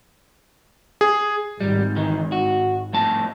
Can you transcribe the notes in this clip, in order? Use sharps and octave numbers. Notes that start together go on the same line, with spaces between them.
G#4
G#1 G3
D#3 E3
F#4
F2 A2 A5